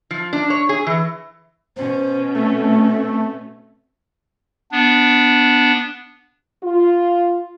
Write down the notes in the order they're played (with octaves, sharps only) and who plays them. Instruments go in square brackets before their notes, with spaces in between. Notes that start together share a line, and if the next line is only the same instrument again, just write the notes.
[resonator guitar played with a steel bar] F3
D4
C#5
G#4
E3
[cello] B2 C#4 [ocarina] C5
[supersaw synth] A3 [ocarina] C4
[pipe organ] B3 D4
[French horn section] F4